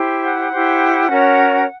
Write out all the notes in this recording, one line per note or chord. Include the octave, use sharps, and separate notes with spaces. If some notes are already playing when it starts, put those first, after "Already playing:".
Already playing: E4 G4 C5
F#5
E4 G4 C5
C#4 F#4 A#4 C#5